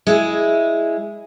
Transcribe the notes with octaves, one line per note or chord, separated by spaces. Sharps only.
G#3 E4 G#4